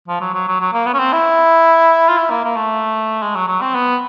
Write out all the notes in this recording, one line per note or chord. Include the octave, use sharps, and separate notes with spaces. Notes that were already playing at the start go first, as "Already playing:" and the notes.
F3
F#3
F#3
F#3
F#3
A#3
B3
C#4
C4
E4
F4
E4
A#3
A#3
A3
G#3
F#3
F#3
C4
B3